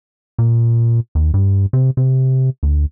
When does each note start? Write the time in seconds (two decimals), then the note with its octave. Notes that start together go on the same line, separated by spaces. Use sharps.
0.39 A#2
1.15 D#2
1.34 G2
1.73 C3
1.97 C3
2.63 D2